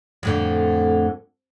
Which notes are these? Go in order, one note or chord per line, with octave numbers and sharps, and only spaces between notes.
F2 A2 D3